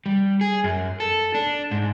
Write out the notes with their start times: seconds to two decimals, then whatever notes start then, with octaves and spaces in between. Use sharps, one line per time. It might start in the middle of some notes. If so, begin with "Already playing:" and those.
0.06 G3
0.41 G#4
0.64 F#2
1.00 A4
1.35 D4
1.71 G#2